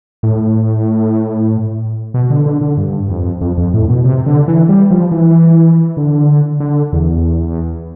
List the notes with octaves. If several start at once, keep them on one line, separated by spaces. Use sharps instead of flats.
A2
B2
D3
D3
D3
G2
F2
F2
F2
A2
B2
C3
D3
E3
G3
F3
E3
D3
D3
E2